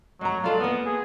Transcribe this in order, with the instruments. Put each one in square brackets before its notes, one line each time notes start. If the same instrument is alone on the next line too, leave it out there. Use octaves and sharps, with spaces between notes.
[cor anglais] F#3 [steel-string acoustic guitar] G#3 A#5
[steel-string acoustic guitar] G#3 A4 D5 [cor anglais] F4
[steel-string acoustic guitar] A#3 B4 [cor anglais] B3
[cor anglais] G#4